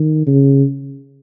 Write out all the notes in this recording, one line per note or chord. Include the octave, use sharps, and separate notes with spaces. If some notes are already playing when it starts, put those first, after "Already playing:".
Already playing: D#3
C#3